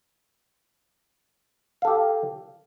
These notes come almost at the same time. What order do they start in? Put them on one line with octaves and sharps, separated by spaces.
F5 A4 G4